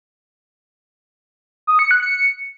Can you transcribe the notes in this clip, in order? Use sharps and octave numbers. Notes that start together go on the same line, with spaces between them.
D#6
C#7
F#6
C#7